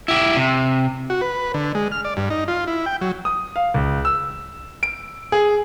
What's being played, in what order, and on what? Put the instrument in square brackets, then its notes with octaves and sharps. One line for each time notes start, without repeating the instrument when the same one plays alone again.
[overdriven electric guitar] E4 G4
C3
[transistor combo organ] F#4
B4
D3
G#3
F6
D5
G2
D#4
F4
E4
G5
F#3
[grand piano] D#6
F5
C#2
E6
D7
G#4